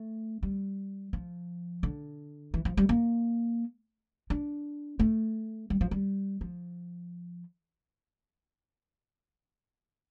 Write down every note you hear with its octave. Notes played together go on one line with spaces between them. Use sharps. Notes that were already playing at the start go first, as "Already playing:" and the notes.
Already playing: A3
G3
F3
D3
E3
F3
G3
A#3
D4
A3
G3
F3
G3
F3